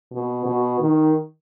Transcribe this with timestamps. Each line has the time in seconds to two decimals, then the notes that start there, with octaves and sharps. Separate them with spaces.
0.12 B2
0.46 B2
0.81 D#3